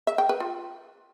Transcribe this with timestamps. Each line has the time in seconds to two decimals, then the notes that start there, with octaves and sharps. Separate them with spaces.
0.07 E5
0.18 G5
0.29 B4
0.40 F4